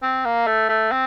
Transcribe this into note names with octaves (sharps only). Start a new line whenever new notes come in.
C4
A#3
A3
A3
C4